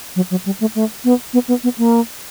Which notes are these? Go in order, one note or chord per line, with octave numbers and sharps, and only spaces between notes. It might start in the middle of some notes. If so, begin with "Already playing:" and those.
F#3
F#3
G3
A3
A3
B3
B3
B3
B3
A#3